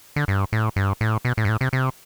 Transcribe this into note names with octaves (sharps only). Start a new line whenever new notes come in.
D3
G2
A2
G2
A2
B2
A2
G2
A2
C3
C3